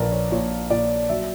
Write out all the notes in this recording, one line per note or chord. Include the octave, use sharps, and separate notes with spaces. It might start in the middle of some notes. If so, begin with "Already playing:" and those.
Already playing: A#1 A#2 A#4 B4 D5
C#5
A#2 C#5
A#2 D5
F#3 E5